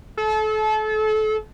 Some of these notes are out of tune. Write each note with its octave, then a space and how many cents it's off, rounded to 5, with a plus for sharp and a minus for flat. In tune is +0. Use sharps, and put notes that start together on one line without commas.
A4 -30